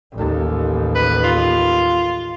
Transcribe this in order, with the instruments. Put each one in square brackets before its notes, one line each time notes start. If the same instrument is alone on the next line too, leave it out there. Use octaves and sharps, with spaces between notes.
[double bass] A1 D#2
[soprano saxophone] B4
F4